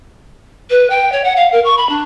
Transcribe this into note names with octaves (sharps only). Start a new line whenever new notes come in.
B4
G5
C#5
F#5
F5
A#4
C#6
B5
D4